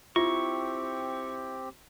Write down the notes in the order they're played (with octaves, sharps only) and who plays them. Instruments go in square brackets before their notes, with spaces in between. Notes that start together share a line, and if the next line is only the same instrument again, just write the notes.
[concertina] C4 G4 [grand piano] E4 [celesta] F4 [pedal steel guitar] C#6